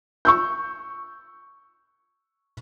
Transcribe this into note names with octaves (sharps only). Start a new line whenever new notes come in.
C#6 E6 G6